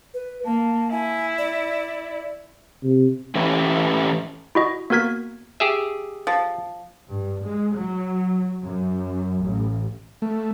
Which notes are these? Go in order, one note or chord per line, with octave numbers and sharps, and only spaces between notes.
B4
A#3 A5
E4 G#5
D5
C3
E3 A3 C#4 E4 G4 B4
E4 F#4 D#5
A#3 B3 F#4 A#4 G#6 B6
G4 G#4 E5
F3
G2
G#3
F#3
F#2
A1
A3